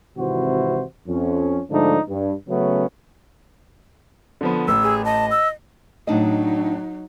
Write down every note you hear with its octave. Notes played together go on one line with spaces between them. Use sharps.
G#1 C3 E3 E4 F#4 C5
F2 C#4
G#2 D3 F3 A3 D4 D#4
G2
C#3 F#3 A3 B3 C#4
D3 F3 B3
A1 E6
G#4
D#5 A5
E6
A2 F#3 D4 D#4 D#5